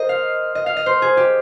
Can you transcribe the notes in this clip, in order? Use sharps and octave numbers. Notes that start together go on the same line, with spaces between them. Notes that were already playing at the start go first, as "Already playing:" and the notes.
Already playing: A#4 C5 D#5
F5
D#5
F5
D#5
C5
G#4
G4